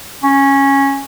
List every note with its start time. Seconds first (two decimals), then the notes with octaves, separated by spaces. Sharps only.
0.23 C#4